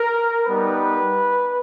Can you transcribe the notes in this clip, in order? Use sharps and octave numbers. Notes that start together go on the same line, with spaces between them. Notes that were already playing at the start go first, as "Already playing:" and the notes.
Already playing: A#4
G3 B3 D#4 B4